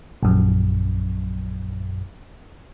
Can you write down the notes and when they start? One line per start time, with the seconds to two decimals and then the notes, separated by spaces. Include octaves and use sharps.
0.23 A#1 F#2